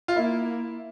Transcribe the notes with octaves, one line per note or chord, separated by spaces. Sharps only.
F4
A#3 E4